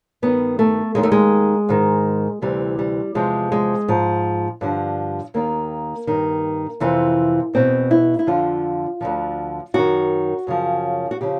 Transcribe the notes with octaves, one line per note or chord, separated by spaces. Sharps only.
G2 D#3 B3
A3
D#2 D#3 G#3
A3
G#3
G#2 D#3
D2 C3 E3 G3
G3
E2 C3 F3 G#3
G#3
G#2 F3
G2 D3 F3
D#2 D#3 A#3
G2 D#3
F2 C3 E3
E2 B2 C4
E4
E4
F2 D3 F3 F4
D2 D3 F3
F#2 D#3 F#4
F#2 C#3 F3
F#4
C#3 F3 G4